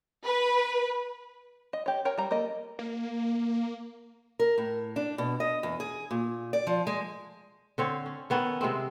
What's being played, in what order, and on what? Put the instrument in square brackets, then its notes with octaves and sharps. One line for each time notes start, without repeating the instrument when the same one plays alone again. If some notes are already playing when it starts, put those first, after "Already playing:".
[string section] B4
[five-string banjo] D#5
G4 C#5
A#4 C#5 G5
G3 A#5
A#3 A4 D#5
[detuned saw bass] A#3
[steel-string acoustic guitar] A#4
A2
D4
B2
D#5
E2
G#4
A#2
D5
F3
G#3
[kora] D3 C4 C#5
C#4
D#3 B3 C#4 A4
C3 G#3 A3 C4